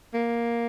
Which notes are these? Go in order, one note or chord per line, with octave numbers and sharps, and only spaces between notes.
A#3